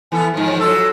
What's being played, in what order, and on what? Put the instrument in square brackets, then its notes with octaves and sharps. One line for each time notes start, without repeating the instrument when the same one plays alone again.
[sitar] E3 B3 A4 [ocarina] G#5
[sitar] G#2 D#3 F3
[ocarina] C#5
[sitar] F#3 F4 A4 [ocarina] E6